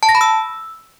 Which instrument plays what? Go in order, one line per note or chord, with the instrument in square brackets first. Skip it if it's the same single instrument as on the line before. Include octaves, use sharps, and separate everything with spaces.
[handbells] A5
A#6
B5
E6